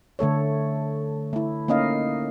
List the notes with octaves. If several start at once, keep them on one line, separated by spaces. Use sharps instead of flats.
D3 A3 A4 C#5
A3 E4
A#3 C#4 D#4 D#5 F5